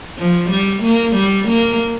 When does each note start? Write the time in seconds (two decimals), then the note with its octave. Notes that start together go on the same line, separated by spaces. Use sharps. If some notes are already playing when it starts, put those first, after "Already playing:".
0.18 F3
0.50 G3
0.83 A#3
1.15 G3
1.48 A#3